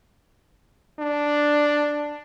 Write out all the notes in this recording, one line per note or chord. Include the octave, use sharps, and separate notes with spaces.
D4